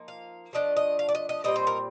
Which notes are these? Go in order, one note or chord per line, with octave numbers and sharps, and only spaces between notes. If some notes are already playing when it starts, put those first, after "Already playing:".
Already playing: F3 A#3 D#4
F5
F3 A3 D4 D#5
D#5
F5
D5
D#5
D#5
A#2 G3 C4 D#4 D#5
C5
A#4